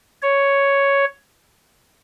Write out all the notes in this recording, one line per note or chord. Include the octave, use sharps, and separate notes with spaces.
C#5